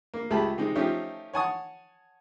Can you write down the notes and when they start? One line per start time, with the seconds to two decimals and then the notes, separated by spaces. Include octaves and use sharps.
0.14 A#3
0.30 C#2 A3 G4 G#4 A5 B5
0.57 C3 G#3 C4 D#4
0.76 F3 A3 C#4 D#4 G4
1.33 C#5 F#5 G#5 A5 C#6 D#6